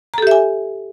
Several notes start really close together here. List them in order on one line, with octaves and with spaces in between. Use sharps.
A#5 A4 G4 E5 G#5